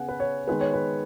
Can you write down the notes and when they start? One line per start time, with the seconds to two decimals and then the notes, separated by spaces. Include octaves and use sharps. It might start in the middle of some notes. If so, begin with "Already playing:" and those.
Already playing: C#3 B3 F#5 G#5
0.09 B4
0.20 C#5
0.47 D#3 G#3 B3 B4
0.61 C#5
0.74 B4